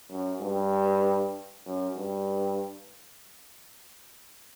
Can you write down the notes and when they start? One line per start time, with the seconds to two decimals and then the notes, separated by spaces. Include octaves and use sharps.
0.11 F#2
0.41 G2
1.66 F#2
1.96 G2